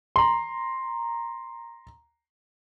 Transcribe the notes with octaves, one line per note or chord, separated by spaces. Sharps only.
A#5 C6